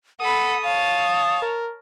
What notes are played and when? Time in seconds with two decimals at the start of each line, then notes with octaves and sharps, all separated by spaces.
0.20 A4 F#5 B5 D#6
0.63 C#5 F5 A5
1.42 A#4